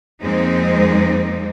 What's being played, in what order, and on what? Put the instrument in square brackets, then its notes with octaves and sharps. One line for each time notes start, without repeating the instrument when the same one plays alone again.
[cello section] F2 G#3 A#3 C4 D#4